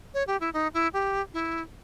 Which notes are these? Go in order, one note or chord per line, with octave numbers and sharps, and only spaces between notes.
C#5
G4
E4
D#4
E4
G4
E4